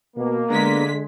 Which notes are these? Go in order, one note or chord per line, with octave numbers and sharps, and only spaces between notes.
B2 A#3
D3 G#3 B3 D4 A#5 B6